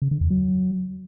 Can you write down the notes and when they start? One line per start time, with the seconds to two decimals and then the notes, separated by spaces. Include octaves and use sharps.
0.02 C#3
0.11 D3
0.21 E2
0.30 F#3